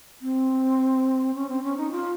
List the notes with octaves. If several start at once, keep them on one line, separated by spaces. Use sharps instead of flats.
C4
C#4
C4
C#4
D#4
F4